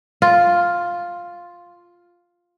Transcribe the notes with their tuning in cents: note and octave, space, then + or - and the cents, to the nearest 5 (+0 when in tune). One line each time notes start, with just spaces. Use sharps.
F4 +5